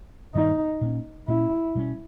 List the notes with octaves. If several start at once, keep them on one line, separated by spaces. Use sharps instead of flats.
G2 D#3 G3 A#3 D#4
A#2 A#3 C#4
A#2 A#3 C#4 E4
B2 G3 C#4